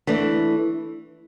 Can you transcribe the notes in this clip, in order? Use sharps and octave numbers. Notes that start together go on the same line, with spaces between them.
E3 A3 D4